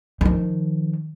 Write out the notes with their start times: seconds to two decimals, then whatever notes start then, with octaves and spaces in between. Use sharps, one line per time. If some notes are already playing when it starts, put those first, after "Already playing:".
0.21 D#3 F3